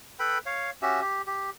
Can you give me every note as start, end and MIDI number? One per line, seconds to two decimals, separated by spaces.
0.19 0.38 69
0.19 0.38 71
0.19 0.38 79
0.19 0.38 83
0.46 0.70 73
0.46 0.70 77
0.82 1.01 61
0.82 1.01 66
0.82 1.01 67
0.82 1.01 76
1.01 1.22 67
1.27 1.50 67